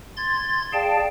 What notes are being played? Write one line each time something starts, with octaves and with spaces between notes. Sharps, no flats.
C6 G#6 A6
G#4 D5 F5 G5 A5